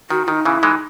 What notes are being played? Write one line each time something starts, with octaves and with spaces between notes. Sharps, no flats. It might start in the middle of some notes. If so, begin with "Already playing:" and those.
D#3 F#4
D#3 D#4
C#3 E3 E4
E3 G#3 D#4